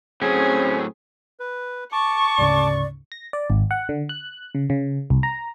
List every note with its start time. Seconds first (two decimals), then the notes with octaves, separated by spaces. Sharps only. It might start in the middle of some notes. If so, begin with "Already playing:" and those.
0.22 A2 F#3 C4 C#4 G#4
1.40 B4
1.92 A5 C#6 D6
2.38 D2 G#2 C#3 D5
3.12 A#6
3.33 D5
3.50 G#1
3.71 F#5
3.89 D3
4.09 F#6
4.55 C#3
4.70 C#3
5.10 C2
5.23 A#5